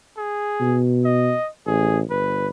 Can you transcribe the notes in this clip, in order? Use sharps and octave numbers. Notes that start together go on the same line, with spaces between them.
G#4
B2
D#5
A1 G#4
G1 B4